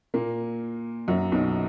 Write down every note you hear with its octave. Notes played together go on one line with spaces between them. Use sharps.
A#2 A#3
F#2 F#3
B1 B2